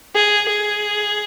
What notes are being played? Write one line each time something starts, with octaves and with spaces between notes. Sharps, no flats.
G#4
G#4